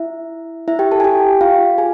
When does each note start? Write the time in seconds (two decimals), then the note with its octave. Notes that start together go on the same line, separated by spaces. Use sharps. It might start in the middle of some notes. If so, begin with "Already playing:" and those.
Already playing: E4 E5
0.68 E4 E5
0.79 G4 G5
0.92 A4 A5
1.00 G#5
1.04 G4 G5
1.41 F4 F5
1.78 G#4 G#5